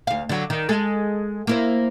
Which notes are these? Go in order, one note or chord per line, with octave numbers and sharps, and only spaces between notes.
D2 F5
D3 F#3
D#3
G#3 G#4 A4
A#3 E4 C5